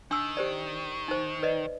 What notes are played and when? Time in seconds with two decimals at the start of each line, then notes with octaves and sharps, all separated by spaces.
0.11 D#3 D4 C6 E6
0.37 G4 C5 D5
1.08 D#4 C5
1.43 B4 D5 D#5